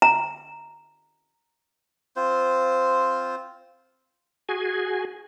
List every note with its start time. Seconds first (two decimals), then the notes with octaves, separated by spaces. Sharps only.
0.02 A#5
2.16 C4 F4 C5
4.49 F#4 G#4 G#5